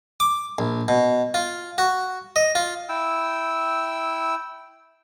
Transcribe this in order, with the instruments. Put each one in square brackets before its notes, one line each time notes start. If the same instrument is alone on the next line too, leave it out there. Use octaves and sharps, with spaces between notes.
[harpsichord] D6
A#1
B2
F4
F#4
D#5
F4
[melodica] E4 G5 E6